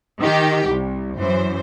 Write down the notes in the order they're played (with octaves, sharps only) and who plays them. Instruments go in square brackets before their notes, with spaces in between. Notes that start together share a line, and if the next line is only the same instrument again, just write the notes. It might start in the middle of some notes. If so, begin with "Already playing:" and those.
[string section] D#3 G4
C2
F#2 E3 C5